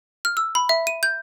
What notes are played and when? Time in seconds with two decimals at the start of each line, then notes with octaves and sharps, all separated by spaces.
0.25 F6
0.37 E6
0.55 B5
0.69 E5
0.87 D#7
1.03 G6